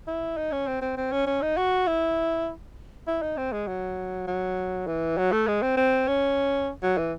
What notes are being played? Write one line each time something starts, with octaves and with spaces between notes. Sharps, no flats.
E4
D#4
C#4
C4
C4
C4
C#4
C#4
D#4
F#4
E4
E4
D#4
C4
G#3
F#3
F#3
E3
F#3
A3
G#3
C4
C4
C#4
F#3
E3